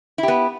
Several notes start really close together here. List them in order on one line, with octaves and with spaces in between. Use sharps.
E4 G4 B3